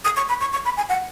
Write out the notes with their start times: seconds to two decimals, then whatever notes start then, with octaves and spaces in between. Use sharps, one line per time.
0.05 D#6
0.17 C#6
0.29 B5
0.41 C#6
0.53 C#6
0.65 B5
0.77 G#5
0.89 F#5